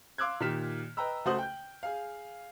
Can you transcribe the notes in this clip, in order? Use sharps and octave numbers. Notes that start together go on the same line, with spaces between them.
F5 C6 D6 E6 F#6 G#6
A#2 D#3 G4 F6 B6 E7
B4 D#5 G5 A#5 B5 E6
C#2 A3 F#4 C5 D#6 F#7
G5 G6
G#4 F5